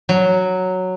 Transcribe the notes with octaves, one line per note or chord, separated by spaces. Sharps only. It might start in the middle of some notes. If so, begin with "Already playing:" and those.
F#3